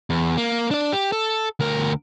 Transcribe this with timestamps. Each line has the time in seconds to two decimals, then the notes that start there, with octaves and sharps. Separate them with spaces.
0.10 E2
0.37 A#3
0.71 D4 D5
0.92 G4
1.12 A4
1.60 D2 A#4